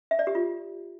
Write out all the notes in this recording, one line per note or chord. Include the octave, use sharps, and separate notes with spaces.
E5
D5
G4
F4